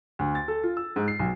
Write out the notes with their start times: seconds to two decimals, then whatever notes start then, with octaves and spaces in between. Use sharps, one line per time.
0.19 D2
0.35 A6
0.48 A4
0.63 F4
0.77 E6
0.96 G#2
1.08 C7
1.19 B1